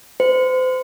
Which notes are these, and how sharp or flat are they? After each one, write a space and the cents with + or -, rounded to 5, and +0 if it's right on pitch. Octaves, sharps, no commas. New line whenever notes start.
C5 -35